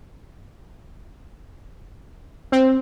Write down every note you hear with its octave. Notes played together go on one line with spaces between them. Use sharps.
C4